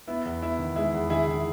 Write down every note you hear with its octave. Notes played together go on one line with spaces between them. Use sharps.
B3 E4
E2
B3 E4
D#3
G#3 E4 G#4
E2
D#3 E4 G#4
D#3 E4